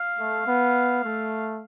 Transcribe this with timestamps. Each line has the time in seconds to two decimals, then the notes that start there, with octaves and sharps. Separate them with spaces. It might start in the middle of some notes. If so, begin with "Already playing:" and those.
Already playing: F5
0.18 A3
0.47 B3
1.03 A3